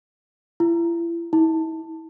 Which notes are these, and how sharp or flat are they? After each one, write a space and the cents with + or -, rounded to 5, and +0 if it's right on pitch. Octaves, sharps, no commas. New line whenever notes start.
E4 +40
E4 -40